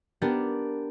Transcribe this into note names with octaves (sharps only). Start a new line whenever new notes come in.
B3 D4 G4 A#4